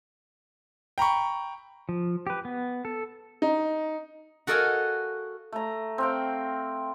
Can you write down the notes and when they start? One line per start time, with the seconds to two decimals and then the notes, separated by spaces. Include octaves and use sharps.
0.98 G5 A#5 B5 C#6
1.89 F3
2.27 G4 B4
2.45 B3
2.85 A4
3.42 D#4
4.47 F#4 A4 A#4 D#5 F5 G#5
5.52 A3 A#5
5.98 C4 F5 G5